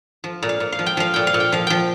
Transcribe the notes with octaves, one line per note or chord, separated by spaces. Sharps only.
F3
A#2
F5
A#2
F5
F3
G5
F3 F5
A#2 G5
F5
A#2
G5
F3 F5
F3 G5